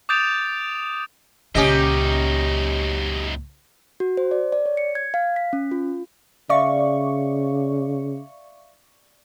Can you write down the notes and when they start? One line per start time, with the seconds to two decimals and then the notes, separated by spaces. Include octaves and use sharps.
0.09 D6 D#6 G6 A6 D7 F7
1.55 C#2 F#2 A#2 C#4 D#4 G4 D#5
4.00 F#4
4.17 C5
4.31 D5
4.52 D5
4.66 C#5
4.77 C#7
4.95 G#6
5.14 F5
5.36 B6
5.53 C#4
5.71 F4
6.49 C#3 D5 E5 F5 C#6